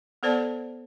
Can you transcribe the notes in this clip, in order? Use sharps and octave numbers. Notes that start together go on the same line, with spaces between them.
B3 A4 C5 D5 A5